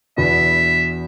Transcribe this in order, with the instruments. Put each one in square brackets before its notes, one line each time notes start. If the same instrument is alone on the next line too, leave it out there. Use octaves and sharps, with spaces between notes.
[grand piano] E2 B2 B3 D4 [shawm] E5